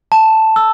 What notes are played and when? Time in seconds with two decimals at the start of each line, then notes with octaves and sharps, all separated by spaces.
0.12 A5
0.56 E6